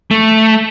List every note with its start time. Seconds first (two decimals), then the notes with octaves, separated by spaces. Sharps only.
0.11 A3